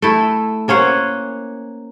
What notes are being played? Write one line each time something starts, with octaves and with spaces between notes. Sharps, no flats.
A3 E4
A#3 C#4 C5 F#5